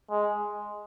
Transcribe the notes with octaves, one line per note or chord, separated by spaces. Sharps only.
G#3